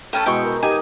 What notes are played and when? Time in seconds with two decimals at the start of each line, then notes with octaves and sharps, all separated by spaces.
0.13 A3 C#4 A4 G5 B5
0.26 B2 G#3 E4 G5 C#6
0.43 A#4
0.63 D#4 G4 G#5